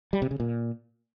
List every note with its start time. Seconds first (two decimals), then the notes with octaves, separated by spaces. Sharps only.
0.13 G3
0.22 C3
0.31 C#3
0.40 A#2